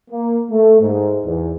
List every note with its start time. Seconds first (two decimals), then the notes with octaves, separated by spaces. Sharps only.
0.11 A#3
0.51 A3
0.80 G#2
1.25 E2